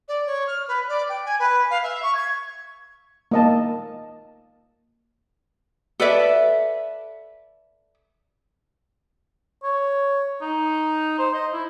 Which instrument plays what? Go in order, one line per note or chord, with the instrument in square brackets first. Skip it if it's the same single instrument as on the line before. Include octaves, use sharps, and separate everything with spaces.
[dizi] D5
C#5
F6
B4
D5
G5
G#5
B4
F5
E5
C#6
G#6
[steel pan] A#3 D#5 A5
[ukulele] A4 B4 D5 E5
[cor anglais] C#5
D#4
C5
D#5
E4